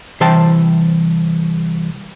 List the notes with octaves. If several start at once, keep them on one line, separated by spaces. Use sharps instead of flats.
C2 E3 C5 E5 G5 A5